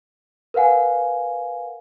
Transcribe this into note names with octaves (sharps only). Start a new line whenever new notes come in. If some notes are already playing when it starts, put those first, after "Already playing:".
A#4 B4 F5 F#5 G#5